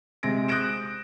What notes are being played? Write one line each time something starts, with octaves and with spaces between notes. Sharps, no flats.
C3 G#3 C4 A#6 D7
D#6 F#6 G6 A#6 D7 E7